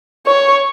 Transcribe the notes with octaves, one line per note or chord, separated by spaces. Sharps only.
C#5